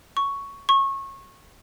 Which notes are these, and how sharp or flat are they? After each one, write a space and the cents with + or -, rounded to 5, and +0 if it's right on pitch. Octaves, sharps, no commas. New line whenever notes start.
C#6 +5
C#6 -25